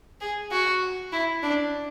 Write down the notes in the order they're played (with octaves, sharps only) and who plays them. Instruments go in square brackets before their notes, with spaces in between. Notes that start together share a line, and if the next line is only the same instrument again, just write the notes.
[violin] G#4
F#4
E4
D4